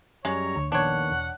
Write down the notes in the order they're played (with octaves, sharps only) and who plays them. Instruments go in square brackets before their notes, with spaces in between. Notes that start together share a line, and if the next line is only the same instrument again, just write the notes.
[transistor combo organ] F#2 G3 A#5 [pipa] G#3 [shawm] C#5
[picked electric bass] D2
[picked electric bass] A#1 [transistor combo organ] D#2 B3 [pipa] D4 C#5 [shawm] F#5
[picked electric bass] E1